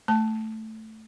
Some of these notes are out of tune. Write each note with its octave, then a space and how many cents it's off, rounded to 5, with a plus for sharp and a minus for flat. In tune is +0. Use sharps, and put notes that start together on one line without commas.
A3 +0 A5 +0